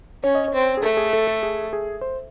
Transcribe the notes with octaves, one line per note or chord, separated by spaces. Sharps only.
C#4 C#5
D#5
C#5
C4
G#4
A3 A4
G#4
A4
A4
G#4
G#4
C5